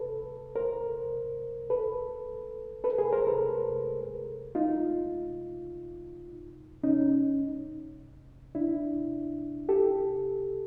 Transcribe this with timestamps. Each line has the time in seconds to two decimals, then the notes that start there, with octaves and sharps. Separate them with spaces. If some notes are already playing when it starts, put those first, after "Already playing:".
Already playing: A4 B4
0.56 A#4 C5
1.70 A4 B4
2.84 A4 B4
2.98 G#4 A#4
3.13 A#4 C5
3.27 A4 B4
4.55 D#4 F4
6.83 C#4 D#4
8.55 D4 E4
9.69 G4 A4